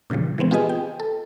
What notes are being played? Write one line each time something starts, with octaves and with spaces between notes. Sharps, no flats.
A#2 C#3 E3 F3 G3
E3 G#3 B3 C4
F4 G4 G#4 B4 D#5 G#5
G5
A4